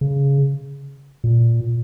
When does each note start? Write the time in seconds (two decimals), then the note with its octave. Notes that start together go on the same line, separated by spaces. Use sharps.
0.01 C#3
1.24 A#2